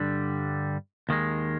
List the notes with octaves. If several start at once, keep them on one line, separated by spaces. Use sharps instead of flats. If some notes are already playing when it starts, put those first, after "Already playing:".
Already playing: G2 D3 G3 D4
D#2 D#3 G#3